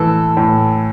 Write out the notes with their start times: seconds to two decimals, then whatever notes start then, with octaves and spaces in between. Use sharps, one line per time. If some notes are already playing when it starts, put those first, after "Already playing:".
Already playing: A2 E3 A4
0.37 A2